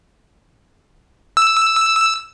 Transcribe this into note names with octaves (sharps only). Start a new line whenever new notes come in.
E6